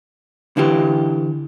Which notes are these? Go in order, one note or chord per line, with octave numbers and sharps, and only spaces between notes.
D3 E3 G4